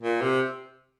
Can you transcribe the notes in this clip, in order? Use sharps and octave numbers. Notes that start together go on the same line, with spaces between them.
A#2
C3